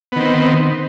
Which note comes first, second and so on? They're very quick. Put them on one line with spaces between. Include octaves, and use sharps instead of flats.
B3 D#3 C4